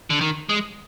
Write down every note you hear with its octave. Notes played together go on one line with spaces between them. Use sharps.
D3
D#3
G#3